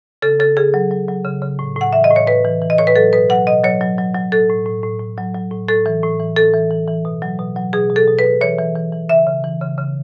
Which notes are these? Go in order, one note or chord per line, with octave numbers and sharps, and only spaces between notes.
C#3 A4
C#3 A4
C#3 G#4
F#3
F#3
F#3
C#3
C#3
A2
A2 F#5
E3 E5
D#5
A2
C#5
A2 B4
E3
E3
D#5
A2 C#5
B4
F#3 A4
B2 B4
F#3 F#5
B2 D#5
F#3 C#5
F#3
F#3
F#3
A2 A4
A2
A2
A2
A2
F#3
F#3
A2
A2 A4
E3
A2
E3
A2 A4
E3
E3
E3
B2
F#3
B2
F#3
B2 G#4
B2
A4
B2
B4
B2
E3 C#5
E3
E3
E3
C#3 E5
C#3
E3
C#3
C#3